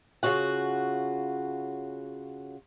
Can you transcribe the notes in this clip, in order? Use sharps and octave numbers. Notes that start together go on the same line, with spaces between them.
C#3 F4 F#4 F#5